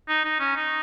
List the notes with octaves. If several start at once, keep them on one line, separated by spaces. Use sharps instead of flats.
D#4
D#4
C#4
D#4